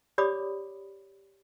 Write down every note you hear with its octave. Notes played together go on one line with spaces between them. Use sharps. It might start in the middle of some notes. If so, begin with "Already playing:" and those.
G4 C#5 D5 B5 D6 D#6